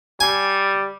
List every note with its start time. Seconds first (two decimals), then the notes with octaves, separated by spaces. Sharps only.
0.20 G3 G#5